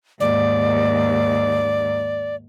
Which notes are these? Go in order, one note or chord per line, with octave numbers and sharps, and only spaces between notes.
D#2 G#2 D5